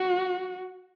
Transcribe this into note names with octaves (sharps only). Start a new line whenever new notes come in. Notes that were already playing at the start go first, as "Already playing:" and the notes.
Already playing: F#4